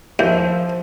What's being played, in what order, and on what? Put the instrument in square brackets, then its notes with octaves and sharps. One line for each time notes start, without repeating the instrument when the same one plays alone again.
[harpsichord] D#2 [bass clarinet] F3 [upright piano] E5 F5 G6